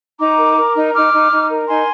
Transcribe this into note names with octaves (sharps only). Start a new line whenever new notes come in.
D#4 A#5 D6
A#4
A#4
D#4
D#4 D6 F6
D#4
D#4
A#4
D#4 G#5 C6